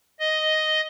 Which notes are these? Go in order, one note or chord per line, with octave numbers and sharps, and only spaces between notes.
D#5